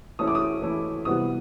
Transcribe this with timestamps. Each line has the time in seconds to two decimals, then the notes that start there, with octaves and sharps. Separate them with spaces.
0.19 E3 A3 C#4 E4 D#6
0.28 D6
0.35 D#6
0.62 E3 A3 C#4 E4
1.05 C3 E3 G3 B3 D#6